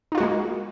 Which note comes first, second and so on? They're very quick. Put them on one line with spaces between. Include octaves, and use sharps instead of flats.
D#4 F4 F#4 G#3 A#3